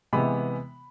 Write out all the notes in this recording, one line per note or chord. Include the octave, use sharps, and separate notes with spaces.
C3 E3 G#3 B3 B5